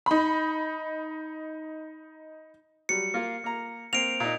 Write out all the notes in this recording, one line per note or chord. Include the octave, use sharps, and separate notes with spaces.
D#4 B5
F#3 G3 C#7
A#3 F4
A#3 A#5
A#3 C4 D7 F7
A#2 D#4